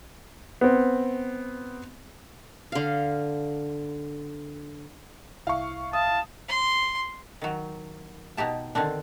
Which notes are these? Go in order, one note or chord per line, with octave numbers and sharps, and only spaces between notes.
B3 C4
D3 F5
C2 E4 E5 F5 C#6
F5 A5 D#6
C6
D#3 F#3
B2 D#4 G4 A5
D3 D#3 C4 D4